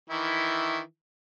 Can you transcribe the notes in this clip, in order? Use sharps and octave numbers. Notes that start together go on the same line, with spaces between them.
D#3 E3 E4